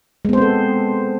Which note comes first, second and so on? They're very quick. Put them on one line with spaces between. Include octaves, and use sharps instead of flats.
G#3 B3 C5 C4 A4